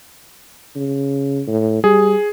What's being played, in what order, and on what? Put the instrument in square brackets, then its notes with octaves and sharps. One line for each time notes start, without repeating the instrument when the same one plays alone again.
[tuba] C#3
A2
[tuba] G3 [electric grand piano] G#4